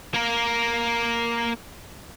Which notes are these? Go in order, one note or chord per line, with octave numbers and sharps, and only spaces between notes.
A#3 A#4